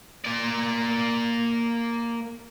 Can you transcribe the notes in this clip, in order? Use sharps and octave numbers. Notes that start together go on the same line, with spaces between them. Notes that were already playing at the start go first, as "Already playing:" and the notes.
A#3 D5